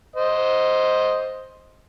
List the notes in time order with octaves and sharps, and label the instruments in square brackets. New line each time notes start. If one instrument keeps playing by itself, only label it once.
[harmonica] C5 D#5